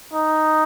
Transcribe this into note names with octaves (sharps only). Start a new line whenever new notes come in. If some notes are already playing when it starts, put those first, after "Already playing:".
D#4